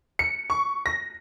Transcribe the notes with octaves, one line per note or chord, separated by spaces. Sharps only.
C#7
C#6
A#6